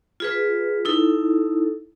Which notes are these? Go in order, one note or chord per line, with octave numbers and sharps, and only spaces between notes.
F4 G#4 B4
D#4 E4 A4